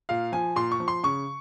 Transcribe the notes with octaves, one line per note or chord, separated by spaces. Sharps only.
A#2 F5
F3 G#5
A#2 C6
C#6
F3
C6
C#3 C#6